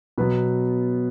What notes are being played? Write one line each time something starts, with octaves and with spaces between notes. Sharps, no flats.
B2 F#3 B3 B4